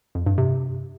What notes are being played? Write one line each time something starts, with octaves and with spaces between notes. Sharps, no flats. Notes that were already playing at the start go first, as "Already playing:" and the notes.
F2
G2
C3